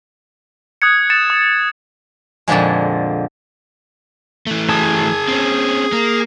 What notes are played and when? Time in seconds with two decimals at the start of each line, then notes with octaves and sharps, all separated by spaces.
0.82 D#6 F#6 G#6 C#7
1.10 A6 C#7 E7
1.30 D#6
2.48 F2 A#2 D3 F3 G#3
4.47 E3 A3
4.69 G#4 A5
5.28 C4 C#4
5.92 A#3